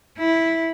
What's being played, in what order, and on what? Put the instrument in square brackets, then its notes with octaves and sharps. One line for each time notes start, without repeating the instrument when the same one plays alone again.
[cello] E4